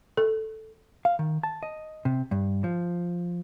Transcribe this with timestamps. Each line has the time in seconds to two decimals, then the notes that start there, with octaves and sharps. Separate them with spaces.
0.17 A4
1.05 F5
1.19 D#3
1.43 A5
1.63 D#5
2.05 C3
2.31 G2
2.64 F3